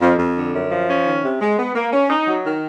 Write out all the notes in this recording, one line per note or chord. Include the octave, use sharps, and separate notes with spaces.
F2
F2
D3
F#2
F3
C#4
D#3
C3
G#3
B3
A#3
C#4
D#4
F#3
D#3